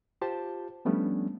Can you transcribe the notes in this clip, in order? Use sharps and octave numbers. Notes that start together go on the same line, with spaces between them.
F4 G4 C5 A5
F3 G3 A3 B3 C#4 D4